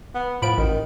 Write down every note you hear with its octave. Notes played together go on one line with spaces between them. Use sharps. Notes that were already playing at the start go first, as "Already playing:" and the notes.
B3
A2 F3 B5 D7
A1 D#3